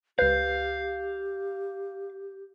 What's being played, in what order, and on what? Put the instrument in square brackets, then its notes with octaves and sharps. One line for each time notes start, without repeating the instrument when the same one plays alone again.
[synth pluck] C#2 B4 [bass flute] G4 [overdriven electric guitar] F5 [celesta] G6 C7